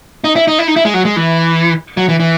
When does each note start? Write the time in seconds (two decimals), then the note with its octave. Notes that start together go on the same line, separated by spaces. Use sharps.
0.24 D#4
0.36 E4
0.48 D#4
0.59 E4
0.68 D#4
0.76 E4
0.85 G#3
0.94 F#3
1.05 G#3
1.16 E3
1.97 F#3
2.09 E3
2.20 E3